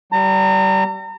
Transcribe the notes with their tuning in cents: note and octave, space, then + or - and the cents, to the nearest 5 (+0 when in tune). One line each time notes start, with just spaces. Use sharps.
G3 -30 A#5 -40